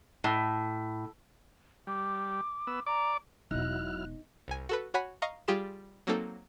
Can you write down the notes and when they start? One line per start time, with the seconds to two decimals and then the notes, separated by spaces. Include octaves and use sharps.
0.24 A2
1.87 G3 D6
2.67 B3 E6
2.86 D5 A#5 D6
3.51 E1 B2 F#3 D#4 E4 F6 F#6
4.48 C2 G#5
4.69 F#4 A4 B4
4.94 F#4 C#5 F#5 G#5 B5
5.22 D#5 F5 A#5 C#6
5.48 G3 F4 G4 G#4 C6 E7
6.07 F#3 A#3 C4 D#4 A4